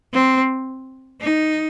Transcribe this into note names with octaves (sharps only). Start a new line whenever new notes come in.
C4
D#4